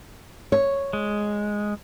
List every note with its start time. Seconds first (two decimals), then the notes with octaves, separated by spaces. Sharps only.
0.52 C#5
0.93 G#3